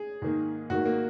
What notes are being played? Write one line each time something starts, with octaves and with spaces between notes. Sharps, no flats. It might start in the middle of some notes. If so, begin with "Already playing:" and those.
Already playing: G#4
G#2 D#3 A#3
G#2 D#3 A#3 F#4
A#3